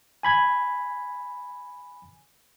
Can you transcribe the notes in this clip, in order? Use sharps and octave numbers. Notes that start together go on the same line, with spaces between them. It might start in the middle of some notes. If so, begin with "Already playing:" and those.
G#5 B5 G#6